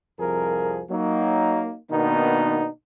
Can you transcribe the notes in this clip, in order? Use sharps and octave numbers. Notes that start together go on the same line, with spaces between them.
C2 F2 F3 G#4 A#4
F#3 A#3 D#4
B2 D#3 A#3 B3 D4 D#4